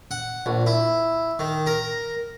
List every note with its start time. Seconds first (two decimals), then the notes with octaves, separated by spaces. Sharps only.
0.11 F#5
0.46 A#1
0.67 E4
1.39 D#3
1.67 A#4